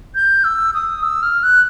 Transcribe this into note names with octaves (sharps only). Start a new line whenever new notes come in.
G6
E6
D#6
E6
F6
F#6